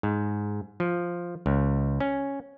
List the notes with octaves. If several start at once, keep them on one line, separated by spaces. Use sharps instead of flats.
G#2
F3
C#2
C#4